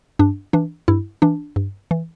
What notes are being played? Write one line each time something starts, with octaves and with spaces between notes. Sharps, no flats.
G2 D4
E3 D4
G2 E4
E3 D4
G2
E3